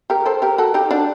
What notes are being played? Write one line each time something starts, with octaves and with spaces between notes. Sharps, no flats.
G4 A#4
A4 C5
G4 A#4
F#4 A4
D#4 G4
D4 F#4